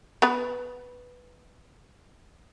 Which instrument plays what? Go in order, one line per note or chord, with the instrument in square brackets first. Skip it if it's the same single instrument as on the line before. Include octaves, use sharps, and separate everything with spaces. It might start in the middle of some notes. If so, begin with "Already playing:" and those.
[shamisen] B3 B4